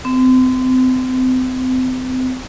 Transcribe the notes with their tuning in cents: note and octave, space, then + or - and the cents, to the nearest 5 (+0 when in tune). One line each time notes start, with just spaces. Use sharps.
C4 -35